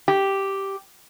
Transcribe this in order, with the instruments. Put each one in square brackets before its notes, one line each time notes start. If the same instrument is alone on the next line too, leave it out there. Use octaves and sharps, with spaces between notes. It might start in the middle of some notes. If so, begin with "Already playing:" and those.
[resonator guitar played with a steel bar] G4